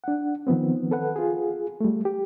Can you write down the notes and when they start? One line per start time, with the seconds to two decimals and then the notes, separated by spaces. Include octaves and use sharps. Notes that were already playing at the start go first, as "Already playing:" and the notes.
0.04 D4 F#5
0.47 D#3 F3 B3 C4
0.91 A4 B4 F#5
1.16 F4 G#4
1.80 G3 A3
2.05 G4